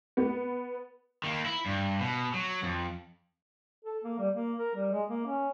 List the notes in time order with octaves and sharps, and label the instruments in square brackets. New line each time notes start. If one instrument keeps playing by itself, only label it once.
[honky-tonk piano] B3
[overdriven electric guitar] D#3 A#3
E4
G2
B2
F#3
F2
[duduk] A4
A#3
G3
A#3
A#4
G3
G#3
A#3
C#4